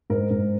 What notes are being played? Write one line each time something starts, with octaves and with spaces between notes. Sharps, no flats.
G#2 A#4
G#2